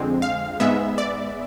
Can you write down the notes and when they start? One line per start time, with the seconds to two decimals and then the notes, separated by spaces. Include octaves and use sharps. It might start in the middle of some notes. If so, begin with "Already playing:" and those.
Already playing: F2 D3 G#3 C4
0.22 F5
0.60 G#2 G#3 B3 E5
0.98 D5